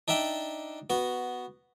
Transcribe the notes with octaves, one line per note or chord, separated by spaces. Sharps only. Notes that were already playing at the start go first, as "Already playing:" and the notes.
D4 D#4 D5 E5 G5
B3 F#4